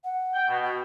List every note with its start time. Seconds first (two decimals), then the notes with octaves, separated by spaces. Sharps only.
0.04 F#5
0.34 G5
0.48 B2
0.64 F#4